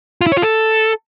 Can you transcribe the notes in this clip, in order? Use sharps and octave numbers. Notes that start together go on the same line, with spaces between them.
F4
E4
C#5
F4
A4